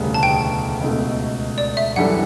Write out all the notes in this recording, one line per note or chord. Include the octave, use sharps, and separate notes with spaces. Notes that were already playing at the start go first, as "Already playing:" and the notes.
Already playing: E1 D2 C#3 G3 B3
A5
G5
C#2 B2 A3
D5
E5
F#2 E3 G3 D4 A4 F#5